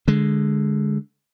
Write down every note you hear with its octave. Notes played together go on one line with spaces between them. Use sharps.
D3 G#3